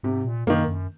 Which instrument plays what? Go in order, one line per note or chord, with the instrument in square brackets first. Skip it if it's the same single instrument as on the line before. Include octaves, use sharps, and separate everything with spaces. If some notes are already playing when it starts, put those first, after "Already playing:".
[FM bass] G#2 [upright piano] C3
[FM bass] A#2
[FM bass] F#2 [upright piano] D#3 A#3
[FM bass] F#2